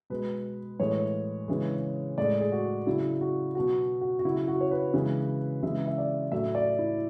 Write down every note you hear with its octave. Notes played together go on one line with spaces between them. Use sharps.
B2 G#3 B4
A2 E3 G#3 C#5
C#3 E3 G#3
A2 G#3 D5
G#4
F#4
C#3 F#3 E4
F#4
B2 F#3 F#4
F#4
F#4
C#3 F#3 E4
F#4
C#5
B4
C#3 E3 G#3
C#3 E3 G#3 E5
E5
D5
A2 F#3 E5
D5
E4